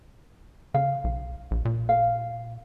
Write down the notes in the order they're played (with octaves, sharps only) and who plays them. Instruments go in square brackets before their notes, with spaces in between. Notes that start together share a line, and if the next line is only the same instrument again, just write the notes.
[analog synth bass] C#3 [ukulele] F5
[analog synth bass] B1
A#1
A#2
[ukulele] F5